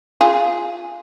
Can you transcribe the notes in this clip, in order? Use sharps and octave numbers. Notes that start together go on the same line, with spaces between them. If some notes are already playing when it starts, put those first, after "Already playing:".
F4 G#4